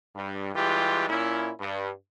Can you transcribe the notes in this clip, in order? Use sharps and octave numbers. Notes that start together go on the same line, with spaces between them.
G2
E3 G3 G#3 F4 G4
A#2 C#4 E4
G2